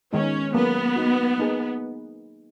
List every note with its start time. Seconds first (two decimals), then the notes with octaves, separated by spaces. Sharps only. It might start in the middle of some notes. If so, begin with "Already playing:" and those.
0.13 D#3 G#3 B3 C#4 D#4
0.54 F#3 A#3 B3 C#4 G#4
0.96 A#3 D#4 F#4
1.38 A#3 D#4 G#4